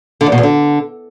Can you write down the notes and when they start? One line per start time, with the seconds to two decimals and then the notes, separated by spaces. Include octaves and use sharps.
0.21 D3
0.26 E2
0.32 B2
0.38 E2
0.43 D3